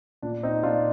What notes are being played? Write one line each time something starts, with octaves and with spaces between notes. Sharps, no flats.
A#2 D4
C4 D#4
A#2 D4 F4